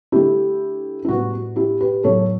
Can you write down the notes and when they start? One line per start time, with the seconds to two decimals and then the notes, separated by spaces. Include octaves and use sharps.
0.12 D3 A3 E4 G4
1.05 E4
1.09 A2 G3 B3 F#4
1.33 F#4
1.56 E4 G4
1.81 G4 B4
2.04 A2 F#3 B3 A4 C#5